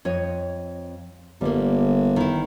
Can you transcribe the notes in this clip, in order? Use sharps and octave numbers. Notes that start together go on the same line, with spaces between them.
F2 C#5 D#5
G1 G3 A#3
D#3 E4